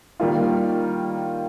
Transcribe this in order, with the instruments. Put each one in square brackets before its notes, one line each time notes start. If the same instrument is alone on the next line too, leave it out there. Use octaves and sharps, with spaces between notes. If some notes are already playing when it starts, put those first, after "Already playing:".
[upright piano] D#3 G3 A#3 F4